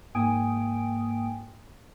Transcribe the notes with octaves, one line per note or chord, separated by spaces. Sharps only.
G#2 A#3 G5 G#5 D#6 D7